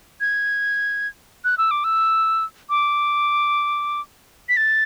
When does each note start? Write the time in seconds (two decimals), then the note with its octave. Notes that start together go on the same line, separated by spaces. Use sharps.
0.21 G#6
1.44 F#6
1.58 E6
1.71 D6
1.84 E6
2.70 D6
4.49 B6
4.57 A6